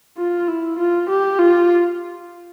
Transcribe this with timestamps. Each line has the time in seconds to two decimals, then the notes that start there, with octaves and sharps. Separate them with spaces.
0.18 F4
0.48 E4
0.78 F4
1.09 G4
1.39 F4